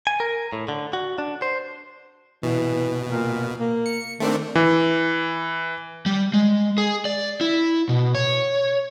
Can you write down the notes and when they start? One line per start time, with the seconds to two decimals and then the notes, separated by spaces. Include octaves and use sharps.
0.07 G#5
0.20 A#4
0.53 A2
0.68 D3
0.93 F#4
1.18 D4
1.42 C5
2.43 B2 E3
3.10 A#2
3.60 A#3
3.86 C#7
4.20 D#3 A3 C4 D4
4.55 E3
6.06 G3
6.34 G#3
6.78 G#4
7.05 D5
7.41 E4
7.89 B2
8.15 C#5